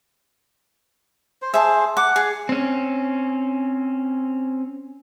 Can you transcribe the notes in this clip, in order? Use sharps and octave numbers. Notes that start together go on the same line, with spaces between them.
C5
G#4 C5 E5 A5
F#5 D6
G#4
C4 C#4